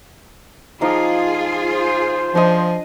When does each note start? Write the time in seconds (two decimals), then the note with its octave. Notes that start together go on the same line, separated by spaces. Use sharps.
0.81 F3 D#4 F4 G#4 D6
1.73 C5
2.35 F3 D4 D#5